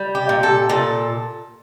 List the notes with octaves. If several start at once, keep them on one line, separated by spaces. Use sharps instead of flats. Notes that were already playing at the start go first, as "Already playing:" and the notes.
Already playing: G3
G4
A#2
A4
A#2 A4